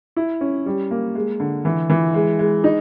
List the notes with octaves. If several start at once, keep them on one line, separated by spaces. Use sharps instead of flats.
E4
C#4
G3
A#3
G#3
D3
E3
E3
G#3
G#3
D#4